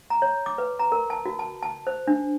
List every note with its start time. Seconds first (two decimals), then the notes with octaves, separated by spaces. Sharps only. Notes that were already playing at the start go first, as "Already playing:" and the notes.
0.10 A#5
0.22 C#5
0.46 D6
0.58 B4
0.79 A#5
0.92 A#4
1.10 A5
1.26 F#4
1.39 A5
1.63 A5
1.87 C5
2.07 D4